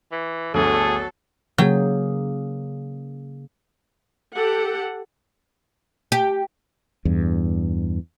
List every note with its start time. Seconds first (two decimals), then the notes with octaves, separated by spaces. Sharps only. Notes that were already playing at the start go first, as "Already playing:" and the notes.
0.12 E3
0.54 G1 D2 F#3 G#4 A4
1.58 C#3 F#3 A#3 G#4 G5
4.35 G4 A4 F#5
6.12 G4
7.05 E2 G2